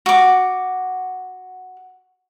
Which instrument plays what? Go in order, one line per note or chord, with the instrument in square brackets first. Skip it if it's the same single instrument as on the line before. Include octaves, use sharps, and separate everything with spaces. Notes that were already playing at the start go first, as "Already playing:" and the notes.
[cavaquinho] F#4 D6